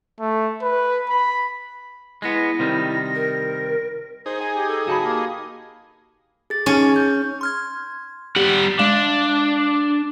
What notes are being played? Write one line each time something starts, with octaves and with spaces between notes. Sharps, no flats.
A3
B4
B5
G#3 B3 E4 A#6
C3 D#3 G3
A#4
D#4 G#4 C5
G#5
G4
A4
C#3 F#3 F#4 A5 B5
A#3 G4
G#4 A6
C#4 D#4 G#4
G6
C6 F6 G#6
G3 G4 F#5
G#3 D4 F5